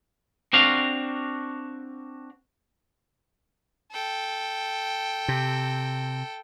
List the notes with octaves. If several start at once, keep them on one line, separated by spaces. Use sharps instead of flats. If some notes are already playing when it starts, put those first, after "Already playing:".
C4 D4 F#4 F5
A4 G5
C3